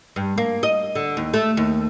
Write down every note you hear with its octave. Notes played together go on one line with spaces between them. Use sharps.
G2
A#3
D#5
D3
D#2
A3
D#2